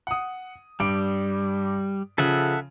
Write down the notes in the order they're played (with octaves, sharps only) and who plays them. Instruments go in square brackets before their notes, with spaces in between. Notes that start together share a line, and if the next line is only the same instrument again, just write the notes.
[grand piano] F#5 D#6
[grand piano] G2 D6 D7 [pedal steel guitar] G3
[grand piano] C#3 F3 [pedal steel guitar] A4 E5 F#5